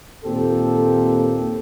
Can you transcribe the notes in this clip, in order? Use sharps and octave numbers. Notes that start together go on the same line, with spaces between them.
D#2 A#2 C4 G4 A4